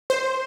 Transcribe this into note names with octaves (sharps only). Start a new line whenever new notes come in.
C5